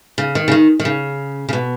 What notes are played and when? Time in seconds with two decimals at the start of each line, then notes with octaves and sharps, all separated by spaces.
0.18 C#3
0.35 D#3
0.48 C#3
0.52 D#3
0.80 D#3
0.85 C#3
1.49 C#3
1.53 B2